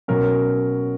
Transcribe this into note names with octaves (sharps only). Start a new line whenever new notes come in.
B2 F#3 C#4 A#4